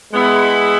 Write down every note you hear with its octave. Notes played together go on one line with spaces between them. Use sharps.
G#3 B3 E4